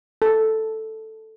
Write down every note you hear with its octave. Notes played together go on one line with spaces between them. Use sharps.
A4